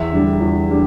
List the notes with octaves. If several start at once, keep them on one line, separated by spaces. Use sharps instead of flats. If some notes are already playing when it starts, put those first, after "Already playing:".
Already playing: E2 E5
D3 G3
E2
D3 G3